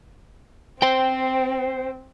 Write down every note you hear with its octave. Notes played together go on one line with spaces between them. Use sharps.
C4 C5 G5